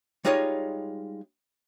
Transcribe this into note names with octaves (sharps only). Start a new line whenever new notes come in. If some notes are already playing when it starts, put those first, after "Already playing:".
G3 G#3 D#4 F4 C#5 D#5